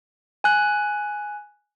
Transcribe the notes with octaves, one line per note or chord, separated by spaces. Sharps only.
G#5 F#6